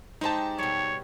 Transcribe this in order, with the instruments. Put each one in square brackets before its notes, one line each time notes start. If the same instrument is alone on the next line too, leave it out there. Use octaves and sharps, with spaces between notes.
[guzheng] G#3 G4 [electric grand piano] D#4 C5 A5
[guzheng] B2 G3 [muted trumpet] C#5